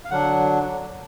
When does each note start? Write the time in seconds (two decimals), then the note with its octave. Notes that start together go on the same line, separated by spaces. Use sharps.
0.05 F5
0.10 D3 F#3 D4 F#5